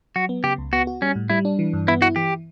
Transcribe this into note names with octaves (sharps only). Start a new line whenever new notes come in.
F#3 F#4
B3
C#3 G4
C#2
B3 F#4
F#4
G3 C#4
A2
G3 E4
D4
E3
G2
B3 E4
E4 F#4
E3 G4